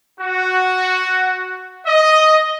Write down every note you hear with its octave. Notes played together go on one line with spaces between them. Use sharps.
F#4
D#5